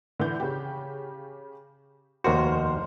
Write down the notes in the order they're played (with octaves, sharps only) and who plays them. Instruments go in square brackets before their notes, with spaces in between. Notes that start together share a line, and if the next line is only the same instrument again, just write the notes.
[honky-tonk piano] D3 E3 G6
C#3 G4
[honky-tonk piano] F1 A#4 C5 [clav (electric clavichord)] D#2 F#4